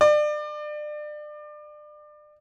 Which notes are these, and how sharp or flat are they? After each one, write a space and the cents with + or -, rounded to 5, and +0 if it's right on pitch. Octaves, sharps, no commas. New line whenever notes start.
D5 +30